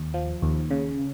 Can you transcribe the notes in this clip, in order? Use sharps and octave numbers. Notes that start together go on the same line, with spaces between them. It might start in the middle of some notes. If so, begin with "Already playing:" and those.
Already playing: D#2
F3
D#2
C#3